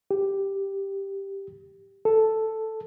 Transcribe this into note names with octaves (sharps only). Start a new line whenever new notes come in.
G4
A4